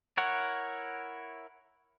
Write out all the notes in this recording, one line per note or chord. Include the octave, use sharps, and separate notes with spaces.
E4 A#4 C#5 F#5